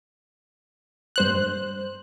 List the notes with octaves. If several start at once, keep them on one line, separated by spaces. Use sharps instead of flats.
G2 C5 F#6